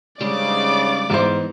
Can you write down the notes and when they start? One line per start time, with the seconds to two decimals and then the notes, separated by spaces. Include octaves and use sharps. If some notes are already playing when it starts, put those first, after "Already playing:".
0.21 G#2 C#3 G3 G#3 D4 D5 D6
1.10 G#2 E3 B3 D#4 C5